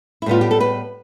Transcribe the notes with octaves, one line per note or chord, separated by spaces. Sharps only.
E4
A2 G3 B3 F4
G4
A4
B4